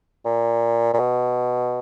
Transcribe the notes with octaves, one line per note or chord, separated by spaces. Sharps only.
A#2
A#2
B2